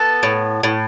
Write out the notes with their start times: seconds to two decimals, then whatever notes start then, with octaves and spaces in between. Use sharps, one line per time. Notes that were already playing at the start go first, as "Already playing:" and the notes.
Already playing: B3 A4
0.23 A2
0.63 A2